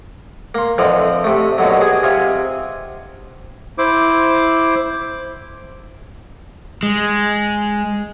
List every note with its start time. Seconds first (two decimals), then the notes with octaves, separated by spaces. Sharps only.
0.55 A#3 C6
0.78 F2 D3 E3 F3
1.24 C3 A3
1.58 D#2 B2 D3 F#3
1.81 B3 G#4
2.03 C3 F4 G#5
3.78 E4 C5 D6
6.83 G#3